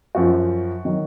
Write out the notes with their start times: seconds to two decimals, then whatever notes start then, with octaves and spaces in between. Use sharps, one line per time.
0.15 F#2 F3 F#4
0.85 D#3 F#3